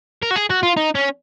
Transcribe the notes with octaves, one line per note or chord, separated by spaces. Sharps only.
A#4
F#4
G#4
F#4
F4
D#4
C#4